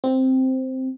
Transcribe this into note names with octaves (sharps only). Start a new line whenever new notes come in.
C4